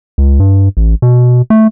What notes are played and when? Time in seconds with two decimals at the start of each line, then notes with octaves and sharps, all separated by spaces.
0.18 C#2
0.40 G2
0.77 A1
1.02 B2
1.50 A3